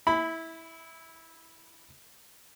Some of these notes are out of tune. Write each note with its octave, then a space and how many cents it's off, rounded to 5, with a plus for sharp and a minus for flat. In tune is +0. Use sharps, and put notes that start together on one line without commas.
E4 -15 B5 +10